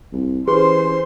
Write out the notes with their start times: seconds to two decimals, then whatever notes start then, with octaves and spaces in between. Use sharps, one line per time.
0.13 C2
0.48 E3 C#4 G4 G#4 B4 C5 C6